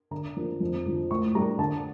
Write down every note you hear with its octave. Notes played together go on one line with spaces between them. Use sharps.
D3 A#5
F3 A#3 D4
F2
D3 F3
A2 C#6
G3 D4 A#5
D3 A5